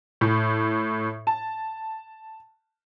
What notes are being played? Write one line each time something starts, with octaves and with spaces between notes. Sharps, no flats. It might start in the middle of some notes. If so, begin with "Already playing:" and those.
A2
A5